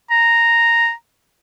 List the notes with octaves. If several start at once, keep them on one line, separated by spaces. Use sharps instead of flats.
A#5